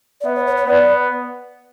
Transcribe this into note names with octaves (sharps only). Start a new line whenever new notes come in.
D5
B3 E5
C#5
C#5
C#5
B3 D5